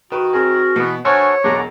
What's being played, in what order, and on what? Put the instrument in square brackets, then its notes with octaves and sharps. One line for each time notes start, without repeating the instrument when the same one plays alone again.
[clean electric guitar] D#3 [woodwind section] F#4 [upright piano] B4
[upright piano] C4 G#4 [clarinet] A#4
[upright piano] B2 [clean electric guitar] E3 B3
[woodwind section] D4 G#5 [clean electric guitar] F#4 A4 A#4 [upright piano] C5 [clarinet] C#5
[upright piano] E1 B1 [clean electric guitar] E2 D4 [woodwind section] A#5